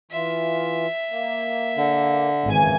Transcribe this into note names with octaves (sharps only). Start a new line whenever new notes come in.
E3 F4 E5
A#3
D3
G#1 F#2 C#3 E3 G#5